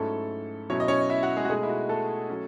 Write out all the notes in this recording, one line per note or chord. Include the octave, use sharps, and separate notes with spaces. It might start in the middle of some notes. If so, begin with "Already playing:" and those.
Already playing: G#2 F#3 A3 C#4 E4 A4
B2 F#3 C#4 E4 C#5
D#5
C#4 C#5
D#5
E4 E5
F#4 F#5
G#3 G#4
F#4
B2 G#3 A3 D#4 G#4
E4
F#4
A3 A4
F#3 C#4